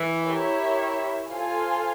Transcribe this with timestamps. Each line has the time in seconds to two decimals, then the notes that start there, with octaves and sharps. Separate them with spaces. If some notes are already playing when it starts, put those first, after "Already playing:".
Already playing: E3
0.22 E4 G4 A#4 C#5 E5
1.26 F4 A4 C5 F5 G#5